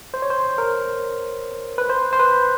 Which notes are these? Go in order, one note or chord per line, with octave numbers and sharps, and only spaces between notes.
C5
C#5
C5
A#4
B4
C5
C5
B4